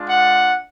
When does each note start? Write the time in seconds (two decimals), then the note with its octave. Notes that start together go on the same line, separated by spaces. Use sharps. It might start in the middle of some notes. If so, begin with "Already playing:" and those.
Already playing: G#3 D4 F4
0.09 F#5